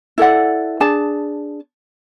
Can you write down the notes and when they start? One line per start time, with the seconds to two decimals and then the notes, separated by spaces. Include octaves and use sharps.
0.18 E4 A4 D5 F#5
0.80 D4 G#4 A5